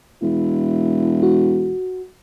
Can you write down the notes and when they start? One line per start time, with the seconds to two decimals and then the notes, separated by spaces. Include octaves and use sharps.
0.23 E1 E4
1.23 F#4